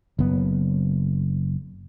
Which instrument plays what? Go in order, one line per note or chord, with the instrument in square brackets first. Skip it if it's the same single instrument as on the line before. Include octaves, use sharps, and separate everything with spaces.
[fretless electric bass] F#1 B3